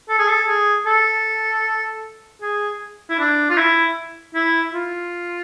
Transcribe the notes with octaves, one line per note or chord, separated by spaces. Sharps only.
A4
G#4
A4
G#4
A4
G#4
E4
D4
F4
E4
E4
F4